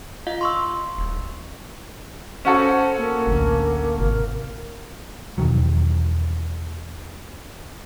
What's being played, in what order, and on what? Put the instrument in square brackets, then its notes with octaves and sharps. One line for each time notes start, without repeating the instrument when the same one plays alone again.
[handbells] F4 D#5 F5
C6 C#6 E6
[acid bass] D#1
[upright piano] C#4 F#4 A4 [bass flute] C5
[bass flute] A#3
[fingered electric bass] A1 D2
[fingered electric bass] G#1 C3 [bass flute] A#4
[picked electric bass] E2 B2 D#3 F#3